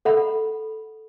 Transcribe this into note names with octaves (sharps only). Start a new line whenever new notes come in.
A4 F#5 B5